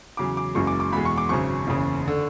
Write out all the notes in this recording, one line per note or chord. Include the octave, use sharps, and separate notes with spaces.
E2 C#3 F#3 D6
D6
F#1 F#2 E3 G#3 C#6
D6
D6
E2 B2 G#3 B5
C#6
D6
G#1 F#2 C#3 C#6
F#1 E2 C#3
D3